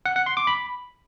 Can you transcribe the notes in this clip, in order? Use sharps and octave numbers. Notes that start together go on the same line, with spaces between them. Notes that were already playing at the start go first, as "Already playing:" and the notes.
F#5
F#5
C6
D6
B5